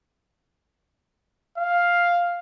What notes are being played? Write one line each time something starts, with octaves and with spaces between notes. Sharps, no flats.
F5